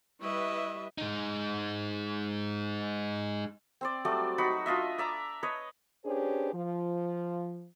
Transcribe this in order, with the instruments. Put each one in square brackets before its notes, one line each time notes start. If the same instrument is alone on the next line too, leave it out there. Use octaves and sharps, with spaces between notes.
[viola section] G3 B4 E5 [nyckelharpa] E4 D#5 [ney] C#6
[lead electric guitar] G#3 D#4
[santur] C4 C5 D5
F#3 G3 A3 D5
D#4 F#4 B5
D4 F4 D#5 E5
D5 E5 A#5 D6
B4 C#5 D#5
[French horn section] C#4 D4 G4 G#4 B4 C5
F3